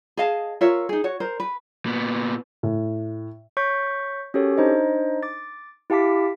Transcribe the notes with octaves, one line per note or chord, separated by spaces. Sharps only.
G#4 D#5 F5 A5
F4 A#4 C#5 E5
D#4 G#4
F#4 C#5
A#4 C5
B4
A#2 B3
A2
C#5 C#6 G6 B6
C#4 F#4 G4 A4 A#4 C#5
D4 D#4 C5 D#5
D6 A6
E4 G4 F5 A5 D6 B6